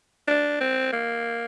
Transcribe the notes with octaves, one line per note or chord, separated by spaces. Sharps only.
D4
C4
A#3